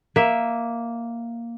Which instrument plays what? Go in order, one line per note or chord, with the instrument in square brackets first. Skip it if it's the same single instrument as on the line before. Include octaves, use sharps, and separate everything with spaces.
[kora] A#3 E5